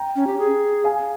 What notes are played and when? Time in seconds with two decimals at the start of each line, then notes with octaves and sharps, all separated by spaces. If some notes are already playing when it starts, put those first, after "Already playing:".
Already playing: G5 A#5
0.16 C#4
0.27 G4
0.39 G#4
0.84 F5 G#5